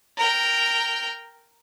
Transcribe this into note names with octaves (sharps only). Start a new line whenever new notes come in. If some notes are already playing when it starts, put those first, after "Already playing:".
A#4 G5